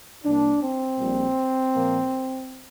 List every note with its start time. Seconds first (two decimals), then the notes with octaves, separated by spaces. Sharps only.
0.25 C2 C3 A#3 D4
0.62 C4
1.00 A#1 A#2 G3
1.74 A#2 F3 A#3